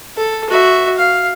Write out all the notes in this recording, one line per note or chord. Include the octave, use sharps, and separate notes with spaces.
A4
F#4 E5
F5